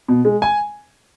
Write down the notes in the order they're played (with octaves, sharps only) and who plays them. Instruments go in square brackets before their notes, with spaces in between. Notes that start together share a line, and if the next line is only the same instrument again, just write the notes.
[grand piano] B2
G#3
G#5